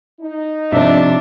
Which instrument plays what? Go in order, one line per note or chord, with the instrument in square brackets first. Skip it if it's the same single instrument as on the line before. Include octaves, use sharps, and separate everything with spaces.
[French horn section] D#4
[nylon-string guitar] C3 F3 [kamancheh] D4 [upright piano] D5 E5